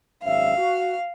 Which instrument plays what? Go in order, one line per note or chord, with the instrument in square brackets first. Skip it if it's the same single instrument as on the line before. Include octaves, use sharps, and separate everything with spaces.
[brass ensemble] G#1 F#2 E5 [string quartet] F5
[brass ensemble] F#4